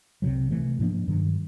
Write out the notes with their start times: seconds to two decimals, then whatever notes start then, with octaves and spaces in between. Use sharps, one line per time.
0.22 C2 C3 D#3 F#3
0.50 C3 E3 A3
0.79 G#2 F3 A#3 D4
1.07 G2 D#3 F#3